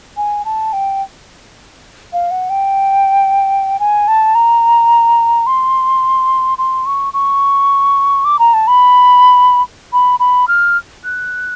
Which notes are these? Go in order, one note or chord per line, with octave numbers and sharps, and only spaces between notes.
G#5
A5
G5
F5
F#5
G5
G#5
A5
A#5
C6
C6
C#6
C#6
D6
A#5
A5
B5
B5
B5
F6
F#6